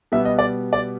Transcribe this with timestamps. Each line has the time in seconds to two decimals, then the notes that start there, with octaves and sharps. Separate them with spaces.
0.12 B2 G3 B3 E5
0.25 D#5
0.39 D5
0.73 D5